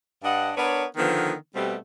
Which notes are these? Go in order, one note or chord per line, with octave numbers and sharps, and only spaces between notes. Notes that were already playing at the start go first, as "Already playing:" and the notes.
G2 D4 D#5 F#5
B3 D4 A#4 B4 C#5
D3 D#3 F3 B3
B2 G3 A3 B3 C4 G4